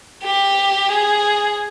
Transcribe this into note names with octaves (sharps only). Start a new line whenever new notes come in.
G4
G#4